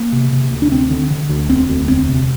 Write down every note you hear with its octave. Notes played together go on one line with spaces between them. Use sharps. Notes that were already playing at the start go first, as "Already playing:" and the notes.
Already playing: A#3
C3
C3
D2
D4
D2 C4
D3
D3
D2
E1 C4
D2
E1 C4
C3